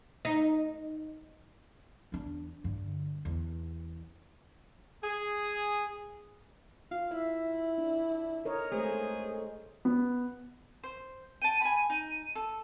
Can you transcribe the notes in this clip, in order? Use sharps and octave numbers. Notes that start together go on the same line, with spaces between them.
D#4
E2 D4
G2 D3
E2
G#4
F4 F5
E4 E5
D4
A#4 C#5 D#5
G#3 A3 G#4 C5
B3
C5
G5 A5 D#7
G#5 B5
D#4
A4